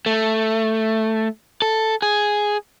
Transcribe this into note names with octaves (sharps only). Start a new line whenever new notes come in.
A3
A4
G#4